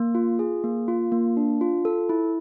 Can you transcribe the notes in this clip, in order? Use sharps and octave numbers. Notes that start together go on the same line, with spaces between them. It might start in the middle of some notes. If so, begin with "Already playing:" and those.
Already playing: A#3
F4
G#4
A#3
F4
A#3
D4
F4
A4
E4